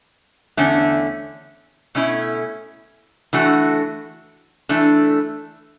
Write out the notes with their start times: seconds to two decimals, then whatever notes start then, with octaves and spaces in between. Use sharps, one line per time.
0.57 E2 D3 A3 C#4
1.95 B2 A3 C#4 E4
3.33 E3 A3 D4 F#4
4.69 E3 A3 D4